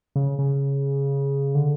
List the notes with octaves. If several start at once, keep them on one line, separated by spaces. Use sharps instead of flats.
C#3
C#3
D3